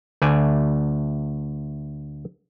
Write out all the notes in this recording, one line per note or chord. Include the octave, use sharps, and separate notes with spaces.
D2 A3 D5 G#5